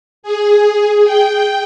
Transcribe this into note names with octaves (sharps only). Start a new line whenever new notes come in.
G#4
G5